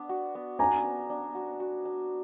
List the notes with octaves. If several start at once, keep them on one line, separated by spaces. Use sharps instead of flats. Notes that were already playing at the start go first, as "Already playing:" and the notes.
Already playing: B3 D4
F#4
B3
D4 G#5 A#5
B3
D4
F#4
F#4
D4